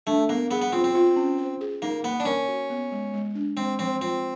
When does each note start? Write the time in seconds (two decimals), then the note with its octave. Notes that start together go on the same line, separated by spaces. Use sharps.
0.07 A3 D4
0.29 A#3 B3
0.51 B3 G#4
0.61 B3
0.72 C4 F4
0.84 C4
0.95 F4
1.16 C#4
1.38 C5
1.61 G#4
1.82 A#3 D#4
2.04 A#3 B3
2.20 D4
2.25 C#4 A#4
2.48 F#4
2.70 B3
2.92 G#3
3.13 G#3
3.35 D4
3.57 G#3 C4
3.79 F3 C4
4.01 C4 F4